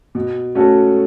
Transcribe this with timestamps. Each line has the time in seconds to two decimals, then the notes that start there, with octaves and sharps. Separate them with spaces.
0.15 B2
0.55 A3 C#4 F#4 A4